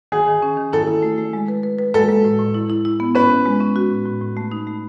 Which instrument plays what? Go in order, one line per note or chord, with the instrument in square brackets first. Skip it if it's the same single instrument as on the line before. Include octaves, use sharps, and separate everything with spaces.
[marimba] D#3 [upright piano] G#4
[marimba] D#3
C#4
D#3
[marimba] E4 [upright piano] A4
[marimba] E4
A3
A3
G#3
B4
B4
B4
[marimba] G#3 [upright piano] A4
[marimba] G#3
A2
A2
E4
E4
E4
B3
[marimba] C#4 [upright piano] B4
[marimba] C#4
G#3
C#4
F#4
A2
A2
A2
A3
D#4
A3